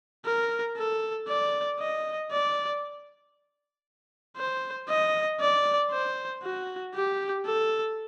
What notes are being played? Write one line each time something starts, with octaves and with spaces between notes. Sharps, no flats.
A#4
A4
D5
D#5
D5
C5
D#5
D5
C5
F#4
G4
A4